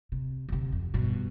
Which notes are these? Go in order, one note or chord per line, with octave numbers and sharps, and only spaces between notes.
C3
D2 C3
F2
G2 B2